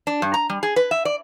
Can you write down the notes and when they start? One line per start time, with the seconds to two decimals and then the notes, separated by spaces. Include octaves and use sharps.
0.07 D4
0.22 G2
0.34 A#5
0.50 G3
0.63 G#4
0.76 B4
0.91 E5
1.05 D5